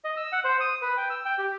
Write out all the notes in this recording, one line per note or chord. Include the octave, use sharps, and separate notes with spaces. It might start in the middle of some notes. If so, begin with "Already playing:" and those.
D#5
E6
F#5
C5
D#6
B4
G5
E6
G5
G4